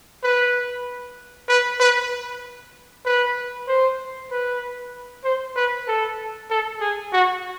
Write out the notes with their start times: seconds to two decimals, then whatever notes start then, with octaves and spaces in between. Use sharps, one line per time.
0.24 B4
1.49 B4
1.80 B4
3.05 B4
3.67 C5
4.31 B4
5.24 C5
5.56 B4
5.87 A4
6.50 A4
6.81 G#4
7.12 F#4